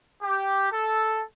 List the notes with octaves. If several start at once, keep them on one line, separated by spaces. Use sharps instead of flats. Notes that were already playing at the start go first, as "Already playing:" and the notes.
G4
A4